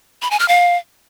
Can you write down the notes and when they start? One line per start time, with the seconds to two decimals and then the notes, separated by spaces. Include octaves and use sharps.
0.22 B5
0.31 G#5
0.40 F6
0.48 F5